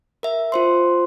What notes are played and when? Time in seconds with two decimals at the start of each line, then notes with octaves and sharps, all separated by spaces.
0.23 A#4 E5
0.52 F4 C5 C6